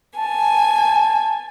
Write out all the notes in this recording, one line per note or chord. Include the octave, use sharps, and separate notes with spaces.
G#5 A5